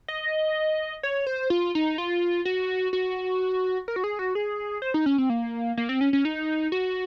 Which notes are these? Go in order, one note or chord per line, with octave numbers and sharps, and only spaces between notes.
D#5
C#5
C5
F4
D#4
F4
F#4
F#4
A#4
F#4
G#4
F#4
G#4
C5
D#4
C#4
C4
A#3
A#3
C4
C#4
C#4
D#4
F#4